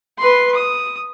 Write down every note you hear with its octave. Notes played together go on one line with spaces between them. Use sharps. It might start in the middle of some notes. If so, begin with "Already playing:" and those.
B4 C6
D#6